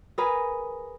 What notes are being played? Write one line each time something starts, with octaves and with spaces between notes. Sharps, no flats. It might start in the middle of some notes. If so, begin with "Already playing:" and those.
G#4 A#4 B4 G#5